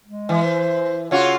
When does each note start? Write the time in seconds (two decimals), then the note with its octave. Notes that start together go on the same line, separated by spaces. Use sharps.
0.06 G#3
0.29 E3
0.44 C5
1.11 C#3 F4 F#4 C#5